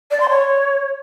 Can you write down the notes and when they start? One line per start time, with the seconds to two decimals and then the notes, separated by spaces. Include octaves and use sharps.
0.11 D5
0.20 C6
0.30 C#5